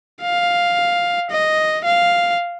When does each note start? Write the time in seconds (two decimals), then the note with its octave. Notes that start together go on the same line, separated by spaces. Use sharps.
0.23 F5
1.31 D#5
1.85 F5